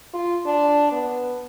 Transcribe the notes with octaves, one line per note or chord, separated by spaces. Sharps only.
F4
D4
B3